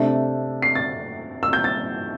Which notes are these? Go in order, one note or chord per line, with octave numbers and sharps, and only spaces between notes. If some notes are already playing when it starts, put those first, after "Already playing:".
Already playing: C3 A3 D4
C7
A6
E6
G6
A6